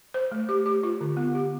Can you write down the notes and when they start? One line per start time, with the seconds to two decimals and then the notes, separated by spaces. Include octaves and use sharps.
0.14 C5
0.32 A3
0.49 G4
0.66 G4
0.83 F4
1.01 D3
1.17 B3
1.35 G4